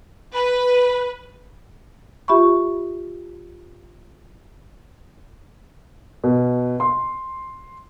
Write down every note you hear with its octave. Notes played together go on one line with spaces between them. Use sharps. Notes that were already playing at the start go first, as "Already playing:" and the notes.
B4
F4 G4 E5 B5 C#6
B2
C6